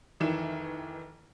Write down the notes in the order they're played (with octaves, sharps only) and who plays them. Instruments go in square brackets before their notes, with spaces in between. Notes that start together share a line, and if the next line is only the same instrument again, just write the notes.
[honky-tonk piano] F1 D#3 E3 E7